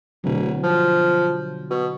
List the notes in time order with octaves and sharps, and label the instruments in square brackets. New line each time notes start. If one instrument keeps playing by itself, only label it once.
[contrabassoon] D1 [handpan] B2 D3 F#3
[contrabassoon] F3
B2